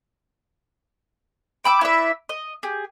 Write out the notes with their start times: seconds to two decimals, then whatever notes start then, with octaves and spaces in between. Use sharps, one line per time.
1.64 G5 B5 D6 E6
1.81 E4 B4 D5 E5
2.29 D#5
2.63 G4 G#4